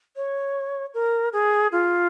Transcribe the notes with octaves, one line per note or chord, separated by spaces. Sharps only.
C#5
A#4
G#4
F4